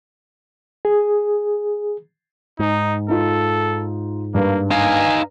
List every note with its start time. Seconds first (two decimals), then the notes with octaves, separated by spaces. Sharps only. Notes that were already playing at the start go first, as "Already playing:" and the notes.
0.85 G#4
2.59 G#2 D#4
3.09 D#4 F4 A4
4.34 G2 A#3
4.71 D#4 F5 G#5